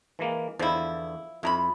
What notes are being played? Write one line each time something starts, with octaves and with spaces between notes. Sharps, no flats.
E3 G#3 A#3
E2 D3 F3 E4
F2 E4 A#5 B5